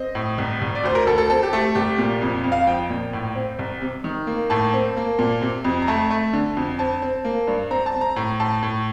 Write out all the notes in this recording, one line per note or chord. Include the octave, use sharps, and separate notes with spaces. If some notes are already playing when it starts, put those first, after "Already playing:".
Already playing: C4 D#5
A2
C2
C2
D5
D2 C5
A#4
D2 A4
A4
C4 A4
G4
A3 A4
C2 G4
A#2
F2
F2
F5
F3 G5
A#2
A2
C4
C2
C3
D#3
A#3
A2 A5
C4
A#3
A#2
C3
F2
A#5
A3 A5
A3
D3
F2
C4 A5
C4
A#3
G2
C4 A#5
A5
C4
A#5
A2 A#5
A2 A5
A2